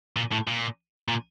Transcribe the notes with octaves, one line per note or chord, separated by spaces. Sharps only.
A#2
A2
A#2
A#2